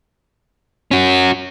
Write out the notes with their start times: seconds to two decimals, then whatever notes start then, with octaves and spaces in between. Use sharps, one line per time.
0.91 C#4 F#4